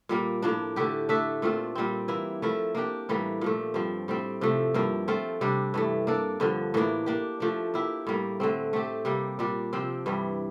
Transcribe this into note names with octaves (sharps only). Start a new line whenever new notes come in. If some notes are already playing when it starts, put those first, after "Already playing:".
A#2 G3 A#3
A2 F3 A#3 D4
D3 A3 E4 G4
A3 D4 A4 E5
A#2 A3 C4 F4
A#2 G3 C4
E3 A#3 E4
F3 A3 E4 A#4
A#3 D4 G4
A2 E3 G3 A#3
A#2 F3 A3
G2 F3 C4
A2 G3 C4
C3 F3 A3
G2 F3 A#3 E4
A3 C4 F4
C3 G3 D4
G2 E3 A3
A#3 D4 A4
G2 D3 F3
A2 E3 A#3 D4
A#3 D4 G4
F3 A3 D4
A#3 E4 G4
A2 G3 A#3
D3 A3 C4
A3 C4 G4
C3 G3 A#3
A#2 G3 D4
C3 F3 C4
G2 E3 G3